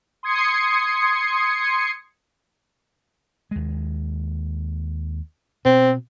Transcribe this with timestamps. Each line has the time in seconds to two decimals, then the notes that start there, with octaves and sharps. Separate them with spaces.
0.23 C6 D#6 G#6 C7 C#7
3.51 D#2 G#3
5.65 B2 C4